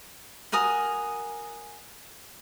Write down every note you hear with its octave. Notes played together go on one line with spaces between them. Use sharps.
F#4 A#4 G#5 D#6